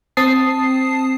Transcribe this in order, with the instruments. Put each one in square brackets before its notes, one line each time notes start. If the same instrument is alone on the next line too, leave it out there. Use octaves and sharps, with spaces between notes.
[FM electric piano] C4 A5 D#6 C7